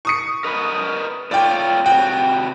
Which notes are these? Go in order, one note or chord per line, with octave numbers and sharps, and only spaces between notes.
C#6 D#6 C#7
A#4 B4 D#5
A3 F4 C#5 D5 G5
C3 F#4 G5